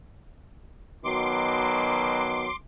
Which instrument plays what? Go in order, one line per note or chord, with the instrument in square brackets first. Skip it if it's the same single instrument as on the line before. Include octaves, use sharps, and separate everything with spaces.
[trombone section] B2 D#3 F#3 [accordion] C6 D6